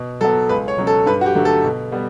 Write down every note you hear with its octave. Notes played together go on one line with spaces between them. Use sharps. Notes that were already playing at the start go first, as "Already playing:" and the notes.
Already playing: B2
F#3 B3 A4
C#2 B4
C#5
B2 F#3 C#4
A4
G2 B4
F#4
G4
D3 F#3 A3
A4
B2
G3 B3